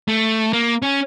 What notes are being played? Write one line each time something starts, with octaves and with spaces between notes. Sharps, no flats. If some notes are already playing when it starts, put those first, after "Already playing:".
A3
A#3
C#4